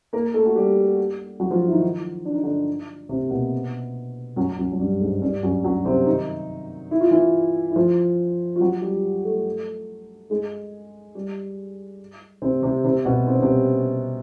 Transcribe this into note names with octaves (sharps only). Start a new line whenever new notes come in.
A#3 A#4
A3 A4
F#4
G3 G4
F#3 F#4
F3 F4
E4
D#3 D#4
D4
D#4
D3 D4
C3 C4
A#3
B2 B3
F#2 F#3
F#2 F#3
F#3
G2 G3
G#2 G#3
G2 G3
F#2 F#3
F#2 F#3
C3 C4
D#3 D#4
E4
F4
E3 E4
E4
F3 F4
F4
F#3 F#4
G3 G4
A3 A4
G#3 G#4
G3 G4
C3 C4
C3 C4
C3 C4
B2 B3
C4
C#4
C3 C4